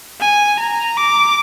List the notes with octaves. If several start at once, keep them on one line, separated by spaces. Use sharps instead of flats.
G#5
A#5
D6